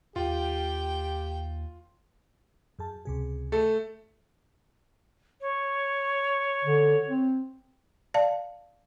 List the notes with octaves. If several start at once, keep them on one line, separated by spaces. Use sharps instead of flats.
D#2 F4 G4 G5
F#2 G#4 A5
C#2 C3 G#4
A3 A4
C#5
D3
C4
D5 F5 A5